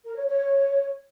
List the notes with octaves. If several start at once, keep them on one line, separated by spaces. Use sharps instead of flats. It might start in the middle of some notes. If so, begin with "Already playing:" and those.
A#4
C#5
C#5